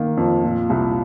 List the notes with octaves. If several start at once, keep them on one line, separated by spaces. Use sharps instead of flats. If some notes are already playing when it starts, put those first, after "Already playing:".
Already playing: D#3 A#3
F2
A#2
C2